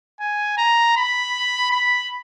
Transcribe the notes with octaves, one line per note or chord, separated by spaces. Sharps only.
G#5
A#5
B5
B5